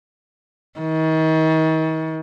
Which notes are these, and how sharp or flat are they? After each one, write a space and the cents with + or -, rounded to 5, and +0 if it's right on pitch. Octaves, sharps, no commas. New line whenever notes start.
D#3 +40